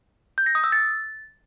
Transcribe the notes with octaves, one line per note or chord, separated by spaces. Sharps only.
G6
A#6
D#6
E6
A6